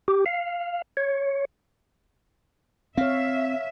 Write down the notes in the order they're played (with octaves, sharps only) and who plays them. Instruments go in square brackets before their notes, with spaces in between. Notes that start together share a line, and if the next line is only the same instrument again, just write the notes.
[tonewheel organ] G4
F5
C#5
[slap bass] C4 [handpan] C#5 F5 [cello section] E5